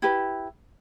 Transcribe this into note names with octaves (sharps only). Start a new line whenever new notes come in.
E4 G4 B4